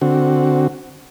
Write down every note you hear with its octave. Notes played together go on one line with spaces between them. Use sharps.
D3 C4 F#4